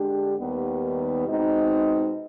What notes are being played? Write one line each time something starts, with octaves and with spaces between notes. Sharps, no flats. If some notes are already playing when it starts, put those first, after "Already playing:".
Already playing: D3 G#3 D4 G4
D#2 D#3 G3 B3
B2 G#3 C4 D#4